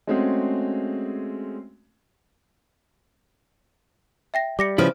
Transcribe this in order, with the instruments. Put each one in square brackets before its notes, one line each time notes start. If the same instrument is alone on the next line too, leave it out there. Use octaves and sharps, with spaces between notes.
[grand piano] G#3 A3 C4 C#4 F#4 G#4
[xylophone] E5 G5 A#6
[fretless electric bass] G3 [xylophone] D6 A#6 C#7
[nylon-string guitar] C#3 F3 C#4 [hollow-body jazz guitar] E4 G#4 B4 [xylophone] F6 D7